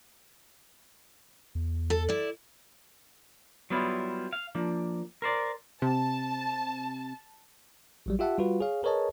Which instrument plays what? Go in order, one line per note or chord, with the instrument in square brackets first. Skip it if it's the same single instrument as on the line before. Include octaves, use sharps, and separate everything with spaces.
[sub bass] E2
[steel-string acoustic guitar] A4
E4 D5
[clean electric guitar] F#3 G3 B3 E4 F4
F5
F3 A#3 D4
A#4 C5 D5
[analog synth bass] C3 [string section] A5
[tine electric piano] A1 F#3 G3
F4 G4 E5 F#5 A5
G3 F4 F#4 B4
G#4 C#5 F5
G#4 A#4 B4 C#5 D#5 A5